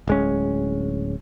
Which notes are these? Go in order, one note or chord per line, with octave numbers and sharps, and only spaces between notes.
D1 G#3 C#4